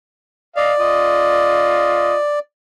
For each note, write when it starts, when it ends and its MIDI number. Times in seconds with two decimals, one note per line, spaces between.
0.56 2.39 74
0.56 0.72 75
0.56 0.72 77
0.79 2.16 65
0.79 2.16 75